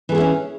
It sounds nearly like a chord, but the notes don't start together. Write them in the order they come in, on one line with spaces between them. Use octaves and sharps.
E3 A4 G#4 E4 C#4